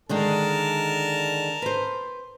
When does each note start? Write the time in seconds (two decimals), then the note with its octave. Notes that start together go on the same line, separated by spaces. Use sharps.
0.09 D3 D#3 G#3 A#4 A5
1.62 B4 C5